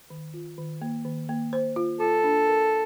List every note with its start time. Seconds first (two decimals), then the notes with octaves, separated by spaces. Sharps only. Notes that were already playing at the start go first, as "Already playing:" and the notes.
0.10 D#3
0.34 F4
0.58 D#3
0.81 A#3
1.05 D#3
1.29 A#3
1.53 C5
1.76 F4
2.00 F4 A4
2.24 D4
2.48 A#4